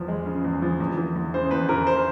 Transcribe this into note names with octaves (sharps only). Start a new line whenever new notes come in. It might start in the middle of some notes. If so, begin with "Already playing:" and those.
Already playing: E2 E3 F3
G#3
C#3
E2
F3
E2
E3
E2
C#3 C5
E2 B4
E3 A#4
C5